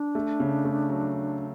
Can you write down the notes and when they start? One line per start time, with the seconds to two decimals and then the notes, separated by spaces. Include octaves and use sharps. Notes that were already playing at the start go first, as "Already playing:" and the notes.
Already playing: D4
0.15 A3
0.40 C#3
0.65 A3
0.89 F#3